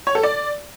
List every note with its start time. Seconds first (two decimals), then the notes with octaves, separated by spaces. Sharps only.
0.07 C#5
0.15 A4
0.23 D5